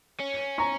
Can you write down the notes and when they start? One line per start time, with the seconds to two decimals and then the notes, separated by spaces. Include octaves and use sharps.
0.20 C#4
0.58 A#5 C#6